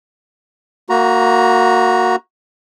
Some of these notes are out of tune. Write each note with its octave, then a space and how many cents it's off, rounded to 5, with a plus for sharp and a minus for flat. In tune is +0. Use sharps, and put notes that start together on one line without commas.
A#3 -15 F#4 -10 A#5 +15